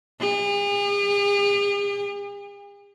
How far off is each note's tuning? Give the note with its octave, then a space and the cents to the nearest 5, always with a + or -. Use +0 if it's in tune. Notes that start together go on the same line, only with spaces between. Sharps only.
G#4 -45